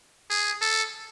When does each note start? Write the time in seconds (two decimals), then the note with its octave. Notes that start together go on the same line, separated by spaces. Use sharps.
0.30 G#4
0.61 A4